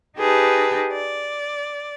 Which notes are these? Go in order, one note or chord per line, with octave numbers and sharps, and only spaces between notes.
D#4 G4 G#4 B4 A5
D5